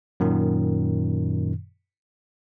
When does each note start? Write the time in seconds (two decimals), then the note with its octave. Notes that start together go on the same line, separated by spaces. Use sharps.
0.20 F#2 A#2 D#3